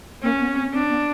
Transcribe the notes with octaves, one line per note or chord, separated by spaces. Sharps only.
A#3 C#4
B3
C4
C4 D4
B3